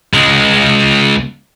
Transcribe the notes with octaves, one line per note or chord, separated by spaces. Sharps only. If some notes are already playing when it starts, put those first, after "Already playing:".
C#2 G#3